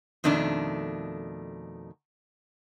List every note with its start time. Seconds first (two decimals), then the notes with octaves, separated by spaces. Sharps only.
0.24 F2 B2 D#3 A3 D4